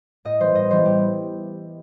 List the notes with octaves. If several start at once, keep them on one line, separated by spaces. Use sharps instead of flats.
A2 D#5
E3 G3 B3 C5
A2 D#5
E3 G3 B3 C5
A2 G4